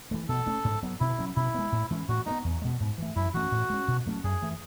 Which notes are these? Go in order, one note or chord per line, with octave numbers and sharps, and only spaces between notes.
E3 A3
B2 A4
A3 C#4
G#2
F#3 B3
B2 E4
F#3 C#4
B2 E4
G#3 B3
A2
E3 G#3 C#4
A2 F#4
G#3 B3 D#4
E2
B2 G#3
G#2
E3 A3
F#2 E4
E3 A3 C#4 F#4
A2
G#3 C#4
B2
F#3 A3 C#4
F#2 G#4
E3 A3